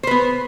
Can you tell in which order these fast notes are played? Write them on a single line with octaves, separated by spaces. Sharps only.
C5 B4 B3